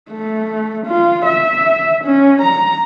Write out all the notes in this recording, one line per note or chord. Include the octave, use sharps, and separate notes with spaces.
A3
F4
E5
C#4
A#5